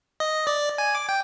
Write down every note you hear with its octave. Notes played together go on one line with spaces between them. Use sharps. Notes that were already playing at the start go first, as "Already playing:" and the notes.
D#5
D5
G#5
D6
G5